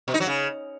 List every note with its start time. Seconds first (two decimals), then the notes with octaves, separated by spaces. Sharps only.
0.08 B2
0.14 D#4
0.20 F#3
0.27 C#3